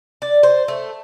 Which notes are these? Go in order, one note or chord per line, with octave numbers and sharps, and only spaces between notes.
D5
C5
A3